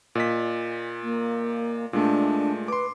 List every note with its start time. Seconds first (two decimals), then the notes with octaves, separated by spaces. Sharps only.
0.15 A#2 D#5 B6
1.02 A#3
1.93 A#2 G#3 A3 D4
2.68 B4 C6 D6